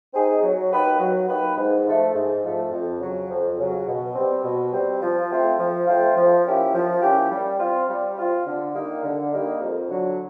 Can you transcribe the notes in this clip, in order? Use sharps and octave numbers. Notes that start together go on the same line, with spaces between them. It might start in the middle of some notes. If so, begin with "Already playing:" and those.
C4 D#4 G#4
F#3
A#3 D#4 G4 B4
F#3
A#3 D#4 G4 B4
G#2
F3 A3
G#2
F3 A3
F2
C#3 F#3
F2
C#3 F#3
B2
G3 C4
B2
G3 C4
F3
A3 C4 F4
F3
A3 C4 F4
F3
A#3 C#4 E4 G4
F3
A#3 C#4 E4 G4
G3
C4 F4
G3
C4 F4
D3
G3 A#3 D#4
D3
G3 A#3 D#4
F2
D3 F#3